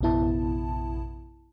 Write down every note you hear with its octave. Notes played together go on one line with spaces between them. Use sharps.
A#1 F#2 C3 B3 E4 A5